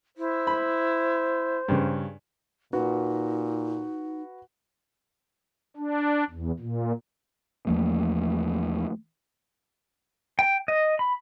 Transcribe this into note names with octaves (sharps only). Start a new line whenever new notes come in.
E4 C5
B5
G2 C#3
A#2 D#4 F#4 B4
D4
E2
A#2
E2 F3 A3 A#3
G5
D#5
B5